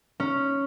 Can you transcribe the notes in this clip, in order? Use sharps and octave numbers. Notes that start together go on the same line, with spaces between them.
C#4